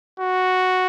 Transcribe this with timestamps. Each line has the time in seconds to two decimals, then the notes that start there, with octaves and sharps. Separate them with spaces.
0.20 F#4